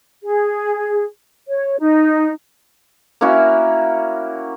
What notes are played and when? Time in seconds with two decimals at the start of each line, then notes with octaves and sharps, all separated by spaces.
0.23 G#4
1.49 C#5
1.79 D#4
3.21 A#3 C#4 E4 F#4